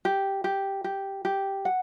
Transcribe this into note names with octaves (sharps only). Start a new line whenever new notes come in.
G4
G4
G4
G4
F#5